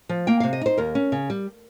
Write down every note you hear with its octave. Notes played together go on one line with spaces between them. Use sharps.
F3
A#3 G5
C3 F5
D#5
D#4 C5
D#2 A#4
C#4
C#3
G3